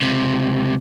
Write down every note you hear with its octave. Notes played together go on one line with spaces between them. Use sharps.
C#2 C3